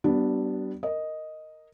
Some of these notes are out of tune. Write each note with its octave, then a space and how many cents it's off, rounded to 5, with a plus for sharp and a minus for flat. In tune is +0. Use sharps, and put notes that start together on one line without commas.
G3 -40 B3 +0 D4 +0
A#4 -10 D#5 +0